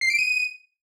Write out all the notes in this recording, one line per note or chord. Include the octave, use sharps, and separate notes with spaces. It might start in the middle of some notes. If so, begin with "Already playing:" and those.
C7
D7
D#7